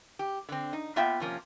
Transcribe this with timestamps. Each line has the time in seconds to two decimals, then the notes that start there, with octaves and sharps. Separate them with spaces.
0.19 G4
0.49 D3 C4
0.73 D#4
0.96 A#3 B3 F4 E5 F#5 G5
1.20 C3 F3 A#3 C#4